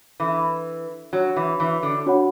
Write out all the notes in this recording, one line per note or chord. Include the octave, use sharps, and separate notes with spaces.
E3 D4 A4 E5
F#3 D4 F#4 C#5
E3
E3
D3
D4 F#4 C#5 F#5 B5